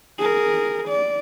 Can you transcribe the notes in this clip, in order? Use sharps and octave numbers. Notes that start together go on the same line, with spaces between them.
G#4 A#4
D5